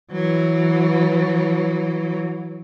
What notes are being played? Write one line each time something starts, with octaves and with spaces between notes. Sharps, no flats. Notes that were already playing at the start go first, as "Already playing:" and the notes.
E3 F#3